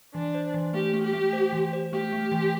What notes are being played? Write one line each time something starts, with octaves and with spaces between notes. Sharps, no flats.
E3 D4
C5
E3
A3 G4
A3
G4
A3
C5
E3
C5
A3 G4
A3
E3